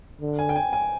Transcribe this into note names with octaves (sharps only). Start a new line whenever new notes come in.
D3
G#5
G5
G#5
G#5